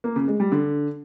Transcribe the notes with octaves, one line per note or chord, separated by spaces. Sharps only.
A#3
C#3
G#3
G3
D3